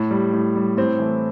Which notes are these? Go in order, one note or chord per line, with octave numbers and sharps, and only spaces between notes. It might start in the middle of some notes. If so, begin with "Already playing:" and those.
Already playing: A2
G3
A2
G3
A2 C4
E3 A3